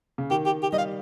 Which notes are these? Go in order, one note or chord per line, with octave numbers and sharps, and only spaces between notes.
C#3
D#3 G4
G4
G4
G3 D#5
F5